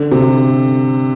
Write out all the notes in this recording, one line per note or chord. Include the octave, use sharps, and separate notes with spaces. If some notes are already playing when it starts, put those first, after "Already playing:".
Already playing: D3
C3